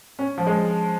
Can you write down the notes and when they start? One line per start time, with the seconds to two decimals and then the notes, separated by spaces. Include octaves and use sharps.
0.19 C#4
0.38 F3
0.47 G#3